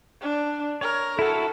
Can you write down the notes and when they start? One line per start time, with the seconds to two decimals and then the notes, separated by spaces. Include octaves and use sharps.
0.21 D4
0.81 A#4 C#5
1.19 E4 F#4 A4